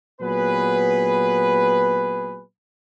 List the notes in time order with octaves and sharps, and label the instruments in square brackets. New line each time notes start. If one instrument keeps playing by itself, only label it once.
[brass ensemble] A#2 F#3 B3 G#4 B4